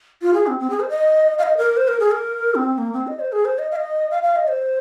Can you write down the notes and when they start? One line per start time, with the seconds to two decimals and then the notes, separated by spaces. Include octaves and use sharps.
0.22 F4
0.34 G#4
0.47 C4
0.60 C4
0.70 G#4
0.80 C5
0.89 D#5
1.38 F5
1.43 D#5
1.58 A#4
1.77 C5
1.88 A#4
2.00 G#4
2.11 A#4
2.55 C4
2.74 C4
2.78 A#3
2.93 C4
3.07 D#5
3.20 C5
3.32 G#4
3.45 C5
3.59 D#5
3.71 F5
3.76 D#5
4.11 F5
4.23 F5
4.36 D#5
4.49 C5